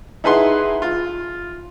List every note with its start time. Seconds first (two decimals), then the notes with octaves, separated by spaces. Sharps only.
0.24 D#4 E4 G#4 B4 F#5 C6
0.82 F4